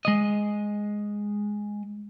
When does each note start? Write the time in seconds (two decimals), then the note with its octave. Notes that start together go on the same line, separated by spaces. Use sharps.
0.05 G#3 D#5